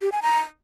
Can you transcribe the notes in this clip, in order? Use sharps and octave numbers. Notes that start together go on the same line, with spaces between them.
G4
G#5
A#5